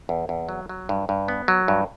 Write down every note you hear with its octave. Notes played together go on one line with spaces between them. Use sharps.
E2
E2
F#3
F#3
G2
G2
B3
F#3
G2